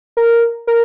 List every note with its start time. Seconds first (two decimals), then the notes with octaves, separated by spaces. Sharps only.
0.17 A#4
0.67 A#4